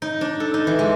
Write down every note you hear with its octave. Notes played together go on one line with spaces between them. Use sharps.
D#4
D4
A4
D#4
E3
G#3